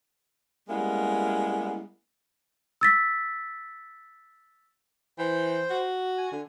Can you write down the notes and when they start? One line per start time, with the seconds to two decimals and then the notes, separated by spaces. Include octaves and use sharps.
0.69 G3 G#3 A#3 B3 C#4 E4
2.81 E6 A6 B6
5.18 E3 C5 G5
5.70 F#4
6.18 G#5
6.32 D3